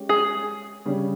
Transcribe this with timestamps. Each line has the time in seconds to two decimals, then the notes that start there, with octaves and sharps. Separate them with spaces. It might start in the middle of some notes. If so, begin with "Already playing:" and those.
Already playing: G#3 C#4 G4 C#5
0.09 G#4
0.86 C#3 G3 C#4